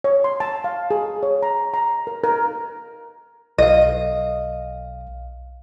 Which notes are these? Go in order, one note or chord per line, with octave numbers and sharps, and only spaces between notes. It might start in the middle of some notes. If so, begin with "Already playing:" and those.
C#5
C6
A5
F5
G#4
C#5
A#5
A#5
A#4
A#4
B1 D#5 F5